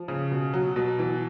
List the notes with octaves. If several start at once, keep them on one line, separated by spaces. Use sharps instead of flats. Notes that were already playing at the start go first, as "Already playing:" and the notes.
Already playing: F3
C#3
B2
F#3
B2
E3